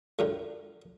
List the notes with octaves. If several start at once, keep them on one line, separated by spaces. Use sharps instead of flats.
C#2 F#2 D3